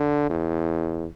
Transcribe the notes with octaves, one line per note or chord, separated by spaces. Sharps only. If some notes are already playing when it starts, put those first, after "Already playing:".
Already playing: D3
E2